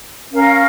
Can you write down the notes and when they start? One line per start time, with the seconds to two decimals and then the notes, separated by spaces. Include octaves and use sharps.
0.30 C#4 A#4 F5